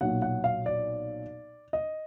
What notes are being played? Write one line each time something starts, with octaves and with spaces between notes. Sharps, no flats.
B1 A#2 F#3 F#5
F#5
F5
D5
D#5